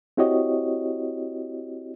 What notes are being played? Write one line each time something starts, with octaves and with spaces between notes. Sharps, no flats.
C4 E4 F#4 G4 C#5 D#5